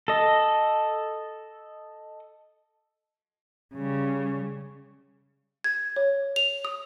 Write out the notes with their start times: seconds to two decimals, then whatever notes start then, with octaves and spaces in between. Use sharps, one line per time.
0.08 A4 D#5
3.75 C#3 G3
5.64 G#6
5.96 C#5
6.36 F7
6.65 D#6